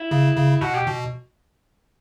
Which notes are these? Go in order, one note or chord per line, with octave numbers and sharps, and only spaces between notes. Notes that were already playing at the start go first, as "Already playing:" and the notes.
Already playing: E4
C#3
C#3
B2 F#4
G4
B2